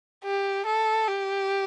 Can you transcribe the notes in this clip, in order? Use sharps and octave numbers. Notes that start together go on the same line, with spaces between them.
G4
A4
G4